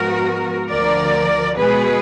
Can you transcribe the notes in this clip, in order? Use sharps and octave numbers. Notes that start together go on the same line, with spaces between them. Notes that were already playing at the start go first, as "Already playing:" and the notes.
Already playing: G#2 F3 G#3 B3 F#4 A#4
D2 D3 F3 A#4 D5
B2 G#3 B3 G#4 B4